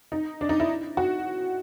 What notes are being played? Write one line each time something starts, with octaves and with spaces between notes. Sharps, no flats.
D#4
D4
D#4
E4
F#4